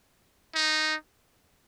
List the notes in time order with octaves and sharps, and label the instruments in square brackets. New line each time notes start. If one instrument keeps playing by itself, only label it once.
[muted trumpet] D#4